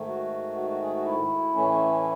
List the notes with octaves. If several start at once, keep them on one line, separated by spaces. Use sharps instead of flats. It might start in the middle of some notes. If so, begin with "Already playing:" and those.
Already playing: G#2 D#3 A3
F#4
F#4
F#4
G#4
F#4
E4
A2 E3 A3 C#4